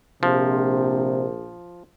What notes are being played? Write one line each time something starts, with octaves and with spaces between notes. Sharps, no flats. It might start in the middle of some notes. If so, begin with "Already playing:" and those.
A#1 C3 F3